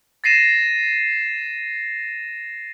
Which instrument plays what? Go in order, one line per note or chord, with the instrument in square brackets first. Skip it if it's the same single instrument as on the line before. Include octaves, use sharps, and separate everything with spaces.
[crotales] A6 A#6 C7 D#7 E7